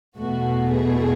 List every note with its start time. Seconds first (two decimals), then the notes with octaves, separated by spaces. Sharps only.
0.18 E2 B2 A3 F#4
0.72 G#4